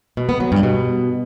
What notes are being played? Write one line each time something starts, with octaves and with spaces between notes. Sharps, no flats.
B2
B3
F#3
G2
B2